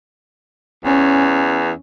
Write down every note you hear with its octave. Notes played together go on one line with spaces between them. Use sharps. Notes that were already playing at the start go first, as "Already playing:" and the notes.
E2 C#4